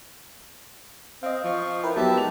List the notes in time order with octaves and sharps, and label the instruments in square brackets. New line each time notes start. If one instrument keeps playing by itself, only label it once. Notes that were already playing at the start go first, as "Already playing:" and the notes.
[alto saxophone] C4 [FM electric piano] D#5 F5
[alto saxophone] F3 [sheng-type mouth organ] C#6
[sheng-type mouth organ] E4 [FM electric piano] A#4 B4 G5
[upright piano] F#3 B3 D#4 [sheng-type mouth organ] G4 E5 A5
[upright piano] G#3 F7